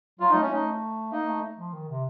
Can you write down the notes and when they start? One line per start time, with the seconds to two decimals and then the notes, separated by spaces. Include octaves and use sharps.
0.20 F#3 F4
0.30 A3 D#4
0.41 C#4
0.50 A3 D#4
1.12 A#3 D#4
1.27 A3
1.58 F3
1.73 D#3
1.88 C3